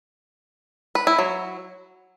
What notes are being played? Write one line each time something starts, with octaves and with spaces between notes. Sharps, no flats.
B4
E4
F#3